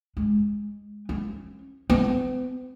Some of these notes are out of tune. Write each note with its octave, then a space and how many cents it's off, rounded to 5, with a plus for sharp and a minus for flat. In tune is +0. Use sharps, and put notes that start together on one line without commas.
G#3 -5
C#4 -30
B3 +45